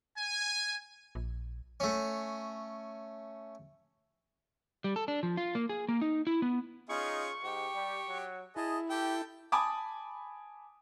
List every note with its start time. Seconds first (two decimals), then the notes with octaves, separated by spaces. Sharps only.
0.18 G#5
1.15 A#1
1.80 A3 C#4
4.84 G3
4.96 A4
5.08 D4
5.23 F3
5.37 F4
5.55 A#3
5.69 G#4
5.89 A#3
6.01 D#4
6.27 E4
6.42 B3
6.89 C#4 D#4 F4 G#4 C#6
7.44 G#2 G4
7.75 G3
8.09 F#3
8.56 E4 G#4 D#5 A5
8.90 G4 A4 G5
9.52 G#5 A5 B5 D6 D#6